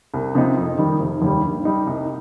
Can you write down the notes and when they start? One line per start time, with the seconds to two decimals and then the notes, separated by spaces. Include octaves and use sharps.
0.13 C2
0.35 C3 F3 D#4
0.57 F2
0.78 D#3 G3
1.00 F1
1.22 D#2 D#3 G3
1.44 G2
1.65 G3 D#4
1.87 C2